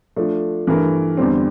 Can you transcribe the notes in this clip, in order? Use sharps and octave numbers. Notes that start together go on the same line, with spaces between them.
F3 A3 D4
G2 E3 A3 E4 A#4
E2 D3 G3 C4